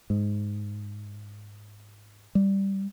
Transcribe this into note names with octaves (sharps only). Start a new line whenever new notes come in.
G#2
G3